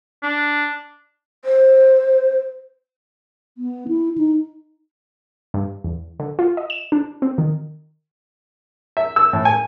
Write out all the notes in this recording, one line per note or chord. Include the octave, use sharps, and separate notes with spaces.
D4
C5
B3
E4
D#4
G2
E2
D3
F4
D#5
E7
D4
C4
D#3
E5
E6
A2
G#5